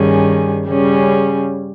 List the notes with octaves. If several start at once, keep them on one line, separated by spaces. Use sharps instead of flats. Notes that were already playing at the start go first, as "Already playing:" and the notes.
Already playing: G2 D#3 G3 C#4 G#4
C#3 G3 C#4 G#4